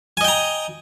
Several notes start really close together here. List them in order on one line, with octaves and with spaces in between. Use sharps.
G#5 D#5 G5 A#5